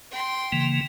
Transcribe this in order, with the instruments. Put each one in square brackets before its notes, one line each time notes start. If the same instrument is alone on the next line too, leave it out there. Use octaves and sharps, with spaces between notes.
[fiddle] G5 C6
[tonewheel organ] C#3 E3 A#3